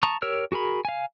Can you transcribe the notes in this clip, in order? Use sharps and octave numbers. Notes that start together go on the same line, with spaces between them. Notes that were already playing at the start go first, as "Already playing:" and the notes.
A5 A#5 C#6 D#6
G4 A#4 C#5 E6 F6
F#4 G#4 A#4 B5
F5 G#5